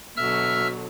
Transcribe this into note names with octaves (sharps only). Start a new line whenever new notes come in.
B2 D3 F#3 E5 E6 F6